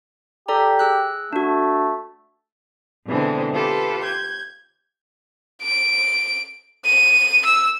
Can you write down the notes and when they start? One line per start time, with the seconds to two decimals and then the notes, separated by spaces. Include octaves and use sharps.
0.48 G4 A4 D5 A#5
0.79 G#4 E6 F#6
1.33 A3 D4 F#4
3.07 B2 D3 E3 G#3 C4
3.53 F4 G4 A4 B4
4.02 G6 G#6
5.63 D7
6.85 D#7
7.45 E6